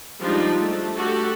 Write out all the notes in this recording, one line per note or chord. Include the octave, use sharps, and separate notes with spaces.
F3 G3 G#3 D4 D#4 F4
A3
F#4 G4 A4